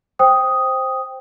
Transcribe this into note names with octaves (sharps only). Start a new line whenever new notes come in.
C5 G5 D#6